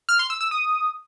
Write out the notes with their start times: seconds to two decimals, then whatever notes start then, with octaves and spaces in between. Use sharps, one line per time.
0.09 F6
0.19 C6
0.30 E6
0.41 E6
0.51 D#6